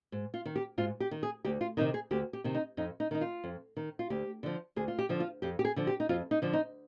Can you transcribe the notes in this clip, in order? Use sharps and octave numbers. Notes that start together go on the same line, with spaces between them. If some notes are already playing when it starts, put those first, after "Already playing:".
G#2
F4
D#3
G4
G#2 F4
G4
D#3
G#4
D2 G4
F4
C3 D#3 D#4
G#4
D2 G4
G4
C3 D#3
D#4
F2 D#4
D#4
D#3 D#4
F4
F2
D#3
F4
D2 G4
D3 F3
D2 G#4
F4
G4
D3 F3
F4
F2 G4
G4
G#4
D3 F3
G4
D#4
F2 F4
D#4
D3 F3
D#4